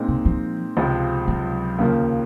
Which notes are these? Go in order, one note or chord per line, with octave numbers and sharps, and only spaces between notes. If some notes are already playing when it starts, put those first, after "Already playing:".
Already playing: A#2 G#3 C4 D#4
C#3
F3
C#2 C3 F3 G#3 C4
F#3
D#2 C#3 F3 A#3